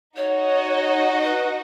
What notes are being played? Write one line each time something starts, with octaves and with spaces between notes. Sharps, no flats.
D#4 F#4 C#5 D#5 F#5
B4